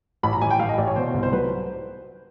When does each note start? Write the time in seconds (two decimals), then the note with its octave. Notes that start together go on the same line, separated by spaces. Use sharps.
0.23 A1 B5
0.33 A#5
0.41 A1 G#5
0.51 G5
0.60 A1 F5
0.69 D#5
0.78 A1 D5
0.87 C#5
0.96 B2 C5
1.14 C2
1.23 C5
1.33 F#3 B4